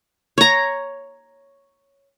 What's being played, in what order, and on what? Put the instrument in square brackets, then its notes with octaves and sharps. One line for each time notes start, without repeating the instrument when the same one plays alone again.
[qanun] C#5 A#5